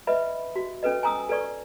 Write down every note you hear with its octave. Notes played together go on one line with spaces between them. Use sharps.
B4 D#5 E5 B5
F#4
C#4 A4 B4 D#5
G#5 A#5 D#6 E6
A4 B4 D5 C#6